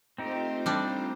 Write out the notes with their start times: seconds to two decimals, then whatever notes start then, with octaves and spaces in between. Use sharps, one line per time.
0.18 A3 C4 D#4 F4 G4 C5
0.66 G3 D4